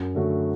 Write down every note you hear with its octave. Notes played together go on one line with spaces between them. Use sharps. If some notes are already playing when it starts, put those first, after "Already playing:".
Already playing: F#2
D3 A3 C#4 F#4